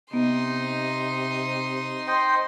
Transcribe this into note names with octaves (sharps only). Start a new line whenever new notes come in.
C3 B3 D#4 C6
C5 D#5 G5